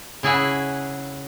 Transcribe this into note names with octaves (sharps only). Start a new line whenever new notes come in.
C#3 E4 G#4 E5 F#5